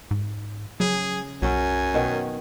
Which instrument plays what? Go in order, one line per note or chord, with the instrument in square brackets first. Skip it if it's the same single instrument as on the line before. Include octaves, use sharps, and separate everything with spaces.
[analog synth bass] G#2
[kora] C#3 [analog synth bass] F#3 [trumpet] G#4
[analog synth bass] B1 [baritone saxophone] F#2 [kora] F#3 C#4 [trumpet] G#5
[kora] B2 D#3